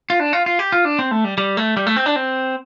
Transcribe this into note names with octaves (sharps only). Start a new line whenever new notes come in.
F4
D4
F4
F4
G4
F4
D4
C4
A3
G3
G3
A3
G3
A3
C4
D4
C4